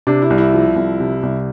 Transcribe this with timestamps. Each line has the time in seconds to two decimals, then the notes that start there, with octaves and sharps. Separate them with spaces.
0.07 C3 D4
0.22 E4
0.30 C2
0.38 E4
0.54 F3
0.76 C2
1.00 C3
1.23 C2